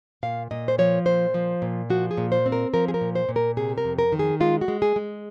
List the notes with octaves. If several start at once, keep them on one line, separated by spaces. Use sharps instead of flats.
A#2 F5
A#2 D#5
C5
F3 C#5
A#2 C5
F3
A#2
F3 F#4
G#4
A#2
C5
C4
A#4
F3 A#4
G#4
A#4
A#2
C5
A#2
A#4
C3 G#4
A#4
F2
A#4
D#3
G#4
G#3 F4
F#4
G#3
G#4
G#3